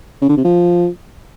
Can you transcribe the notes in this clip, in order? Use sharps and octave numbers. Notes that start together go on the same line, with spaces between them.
C#3
D3
C3
F3